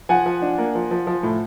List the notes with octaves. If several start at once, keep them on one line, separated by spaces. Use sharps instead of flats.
F3 F#5 G#5
F3
D4
A#3
F3
F3
F3
A2